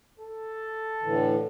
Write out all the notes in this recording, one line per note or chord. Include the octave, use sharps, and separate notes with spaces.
A4
A2 D3 E3